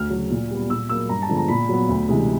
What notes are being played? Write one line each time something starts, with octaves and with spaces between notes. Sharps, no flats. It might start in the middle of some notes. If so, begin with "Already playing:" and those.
Already playing: D2 F6
F#3
C#3
A#2
G3 B3
A#2 E6
F#3 A#3 E6
G2 A#5
A5
D3 F3 G#3 B3
A#5
A#2 B5
F#3 B3
D2
C3 E3 G#3